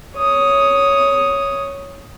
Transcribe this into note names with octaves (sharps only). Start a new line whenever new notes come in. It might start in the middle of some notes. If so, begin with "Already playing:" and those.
C#5 D#6